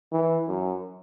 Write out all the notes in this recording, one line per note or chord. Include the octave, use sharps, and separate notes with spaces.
E3
F#2